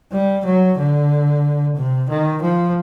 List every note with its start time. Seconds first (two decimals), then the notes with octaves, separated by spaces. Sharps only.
0.12 G3
0.45 F#3
0.78 D3
1.76 C3
2.09 D#3
2.42 F3